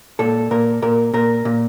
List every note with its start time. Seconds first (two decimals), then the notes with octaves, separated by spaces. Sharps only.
0.19 A#2 A4
0.51 A#2 A#4
0.82 A#2 A#4
1.14 A#2 A#4
1.45 A#2